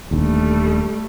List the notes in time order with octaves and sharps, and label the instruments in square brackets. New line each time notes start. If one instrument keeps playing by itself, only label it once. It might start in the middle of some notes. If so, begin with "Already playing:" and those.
[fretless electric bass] D#1 D#2 D3 [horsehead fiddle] G3 A3